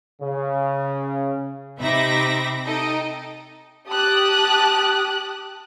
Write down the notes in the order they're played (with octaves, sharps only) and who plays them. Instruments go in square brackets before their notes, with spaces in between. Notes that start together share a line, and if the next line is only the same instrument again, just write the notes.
[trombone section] C#3
[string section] C3 D#4 E5 B5 D6 A#6
D#4 A4 D#5 G5
[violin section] G4 A5 D#6 F#6